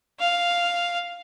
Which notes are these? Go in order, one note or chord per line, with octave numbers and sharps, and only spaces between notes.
F5